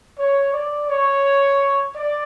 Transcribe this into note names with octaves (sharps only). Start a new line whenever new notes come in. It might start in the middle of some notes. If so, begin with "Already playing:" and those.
C#5
D5
C#5
D5